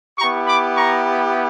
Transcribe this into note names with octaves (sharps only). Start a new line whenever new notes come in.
B3 E4 G4 A#5 C#6
B5 D6
A#5 C#6